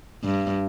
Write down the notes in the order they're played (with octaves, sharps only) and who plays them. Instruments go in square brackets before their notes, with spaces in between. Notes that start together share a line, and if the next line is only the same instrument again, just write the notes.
[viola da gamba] G2